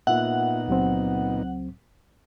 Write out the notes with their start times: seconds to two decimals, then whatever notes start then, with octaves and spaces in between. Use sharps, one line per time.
0.07 A#2 A#3 B3 D#4 F4 E5 F#5
0.68 C#2 F#3 C4